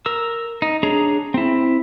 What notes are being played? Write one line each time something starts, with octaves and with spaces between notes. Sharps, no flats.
A#4 E6
D#4
D4 G#4 C#5 A#5
C4 E4